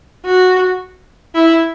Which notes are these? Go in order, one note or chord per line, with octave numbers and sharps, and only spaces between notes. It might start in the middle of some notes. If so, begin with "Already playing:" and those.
F#4
E4